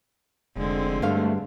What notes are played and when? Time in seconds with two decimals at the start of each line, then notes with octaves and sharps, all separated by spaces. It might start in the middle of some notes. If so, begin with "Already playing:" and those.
0.56 F1 D3 G#3 C4
1.02 G2 A3 F5